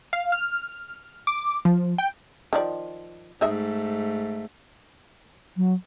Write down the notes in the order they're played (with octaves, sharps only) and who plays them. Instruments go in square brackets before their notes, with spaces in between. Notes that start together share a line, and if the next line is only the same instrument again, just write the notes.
[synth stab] F5
F6
D6
F3
G5
[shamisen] D#3 F3 D5
[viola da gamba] G#2 A3 [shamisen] D#4 D#5 E5
[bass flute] F#3